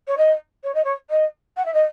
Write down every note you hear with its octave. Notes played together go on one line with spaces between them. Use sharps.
C#5
D#5
C#5
D#5
C#5
D#5
F#5
E5
D#5